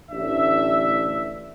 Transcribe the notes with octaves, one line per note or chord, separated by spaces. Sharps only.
A1 D2 D4 E5